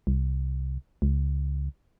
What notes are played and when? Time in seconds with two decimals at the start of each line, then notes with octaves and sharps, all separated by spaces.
0.07 C2
1.02 C#2